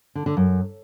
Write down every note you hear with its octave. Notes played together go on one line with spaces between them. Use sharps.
D3
D3
F#2